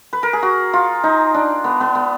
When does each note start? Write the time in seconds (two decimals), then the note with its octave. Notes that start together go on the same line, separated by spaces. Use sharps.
0.13 B4
0.23 A#4
0.33 G#4
0.43 F#4
0.73 F4
1.04 D#4
1.34 D4
1.64 B3
1.80 B3
1.95 B3